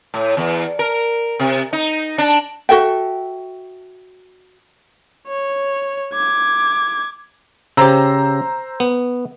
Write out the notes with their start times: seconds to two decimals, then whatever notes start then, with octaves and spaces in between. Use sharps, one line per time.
0.14 A2
0.37 E2
0.79 A#4
1.39 C3
1.73 D#4
2.18 D4
2.69 F#4 A4 E5 G5
5.28 C#5
6.13 D6 G#6
7.77 C#3 G4 C5 A#5 E6
8.80 B3